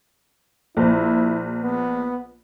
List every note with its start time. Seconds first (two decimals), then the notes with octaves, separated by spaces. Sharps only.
0.77 A#1 E4 C5
1.62 B3